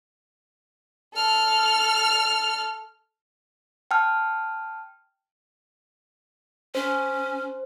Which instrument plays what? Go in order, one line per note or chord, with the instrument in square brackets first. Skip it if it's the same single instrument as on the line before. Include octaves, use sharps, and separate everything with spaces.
[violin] A4 F6
[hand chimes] G5 A5 F6
[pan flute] C#4 [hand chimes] C5